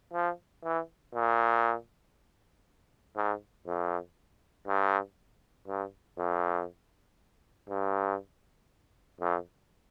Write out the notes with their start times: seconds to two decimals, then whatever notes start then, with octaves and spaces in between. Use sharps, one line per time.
0.14 F3
0.64 E3
1.14 A#2
3.17 G#2
3.67 F2
4.67 G2
5.68 G2
6.18 F2
7.69 G2
9.21 F2